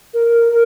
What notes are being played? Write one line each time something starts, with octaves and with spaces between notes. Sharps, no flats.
A#4
A#4